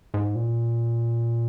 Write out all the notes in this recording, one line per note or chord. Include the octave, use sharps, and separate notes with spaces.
G#2
A#2